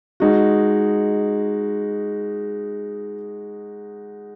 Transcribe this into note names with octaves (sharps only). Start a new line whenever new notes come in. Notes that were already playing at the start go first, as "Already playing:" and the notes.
G#3 D#4 F#4